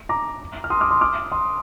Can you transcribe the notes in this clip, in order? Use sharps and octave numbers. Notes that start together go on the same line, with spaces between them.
A#5 D6
F6
C6 D#6
D6 F6
C6 D#6
D6 F6
C6 D#6